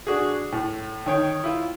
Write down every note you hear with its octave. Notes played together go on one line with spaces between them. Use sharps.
D4 F#4 G#4
A2
D#3 C#5 G5
E4 F4